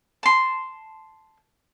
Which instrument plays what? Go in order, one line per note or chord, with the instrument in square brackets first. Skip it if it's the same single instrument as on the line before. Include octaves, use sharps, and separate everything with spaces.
[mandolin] A5 C6